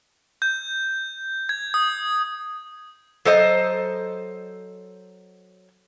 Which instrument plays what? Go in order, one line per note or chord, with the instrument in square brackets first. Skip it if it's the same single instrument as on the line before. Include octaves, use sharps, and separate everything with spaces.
[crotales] G6
G#6
D#6
[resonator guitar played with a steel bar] F#3 A4 C5 D#5